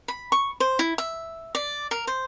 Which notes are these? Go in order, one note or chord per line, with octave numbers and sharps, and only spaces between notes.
B5
C#6
C5
E4
E5
D5
A#4
C5